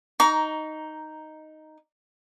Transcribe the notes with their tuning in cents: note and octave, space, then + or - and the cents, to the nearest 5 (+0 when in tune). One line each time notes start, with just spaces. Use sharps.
D#4 +0 A#5 +10 C#6 +45